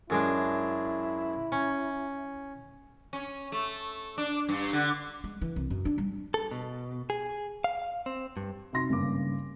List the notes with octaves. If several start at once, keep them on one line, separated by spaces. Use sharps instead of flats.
F#2 G#3 D4 E4
C#4
C#4
A3
D4
G2
D3
G#3
E3
C2
F#2
D4
G3
A4
B2
G#4
F5
C4
G2
C3 D#4 F#4 C6 A#6
G#1 G2 C#3 A#3 D6